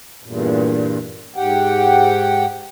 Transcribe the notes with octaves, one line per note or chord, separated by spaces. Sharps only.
E2 G2 A#2
G#2 G4 F#5 G5